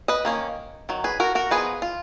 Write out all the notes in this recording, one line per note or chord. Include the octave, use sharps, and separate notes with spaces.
B4 D#5
D#3 A#3 C#4
D#3 F#3
G#4 B4
F#4 A#4
F#4 A#4
F3 B3 D#4 G#4 B4
F4